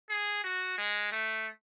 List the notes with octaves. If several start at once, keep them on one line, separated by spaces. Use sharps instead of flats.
G#4
F#4
G#3
A3